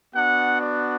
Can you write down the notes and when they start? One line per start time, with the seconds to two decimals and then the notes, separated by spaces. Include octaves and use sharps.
0.14 B3 D4 F#4 F#5
0.61 D5